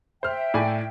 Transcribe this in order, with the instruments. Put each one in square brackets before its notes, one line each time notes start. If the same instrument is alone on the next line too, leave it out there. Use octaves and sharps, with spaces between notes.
[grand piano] C5 F6 [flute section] E5 G5
[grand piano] A2 D5 G#5